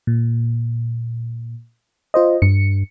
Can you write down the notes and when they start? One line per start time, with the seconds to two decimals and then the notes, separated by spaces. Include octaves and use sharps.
0.07 A#2
2.14 F4 C5 D#5
2.42 G2 C#7